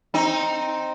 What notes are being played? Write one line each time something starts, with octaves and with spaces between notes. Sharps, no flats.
C4 D#4